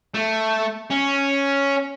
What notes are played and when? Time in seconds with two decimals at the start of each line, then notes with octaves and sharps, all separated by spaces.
0.14 A3
0.90 C#4